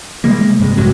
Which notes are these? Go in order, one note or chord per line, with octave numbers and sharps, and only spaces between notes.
C3 G3 G#3 A#3
G2 C3 G#3
A1 C3 F#3